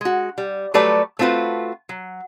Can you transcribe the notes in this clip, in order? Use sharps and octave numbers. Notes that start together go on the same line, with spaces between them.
G#3 F#4
G3
F#3 G3 A3 A4 B4 D5
A3 C4 F4 F#4 B4
F#3